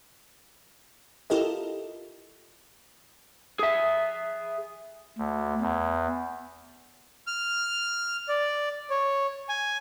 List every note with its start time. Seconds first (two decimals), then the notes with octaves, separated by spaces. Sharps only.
1.30 E4 F4 G4 A4 A#4 D#5
3.59 G#4 E5
5.18 D2
5.61 E2
7.27 F6
8.29 D5
8.90 C#5
9.49 G#5